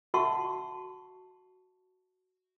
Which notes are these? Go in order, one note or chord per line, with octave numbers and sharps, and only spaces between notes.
F#4 E5 F#5 A5 C6 C#6